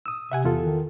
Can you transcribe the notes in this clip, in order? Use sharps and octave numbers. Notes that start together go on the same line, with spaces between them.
D#6 E6
C3 E5 F#5 G#5
E2 F4 A4
D#3